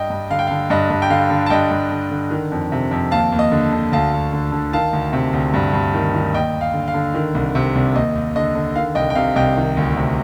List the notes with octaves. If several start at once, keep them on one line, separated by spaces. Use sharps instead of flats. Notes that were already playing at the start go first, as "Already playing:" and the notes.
Already playing: G2 D#5 G5
G2
D3 F5
G5
F5
D3
G2 D#5
G2
G5
D3 F5
D3
A5
G2 D#5 G5
G2
D3
D3
D#3
F2
C3
F2
D#2 F5 A5
D#2
D#5
D3
D3
D2 F5 A5
D2
D3
D3
D#3 F5 A5
D2
C3
D2
G2
G2
D#3
D#3
D#2 D#5 G5
D#2
F5
D3
F5
D3
D#3
C2
C3
C2
D#2 D#5
D#2
D3 D#5
D3
D#3 F5
C2 D#5 G5
G5
C3 F5
C2 D#5 G5
D#3
D2
C3